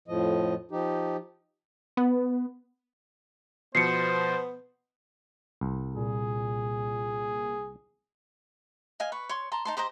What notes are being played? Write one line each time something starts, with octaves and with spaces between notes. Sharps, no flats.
F2 A2 F3 D#5
F3 D#4 G4
B3
B2 F3 B3 C5 C7 C#7
C2
A#2 G#4
D#5 F5 G#5
B4 C#6
C#5 C6
A5 A#5 C6
D#4 A5 C6
G4 C5 D#5 A#5